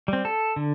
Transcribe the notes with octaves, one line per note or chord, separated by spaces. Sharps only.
G3 C4
A4
D3